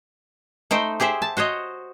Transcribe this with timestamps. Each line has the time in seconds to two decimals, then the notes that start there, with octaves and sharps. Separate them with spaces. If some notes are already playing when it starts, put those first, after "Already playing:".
0.71 A3 D#4 C5 G5
1.00 G4 G#4 C5 E5
1.22 A5
1.37 F#4 C5 C#5 D#5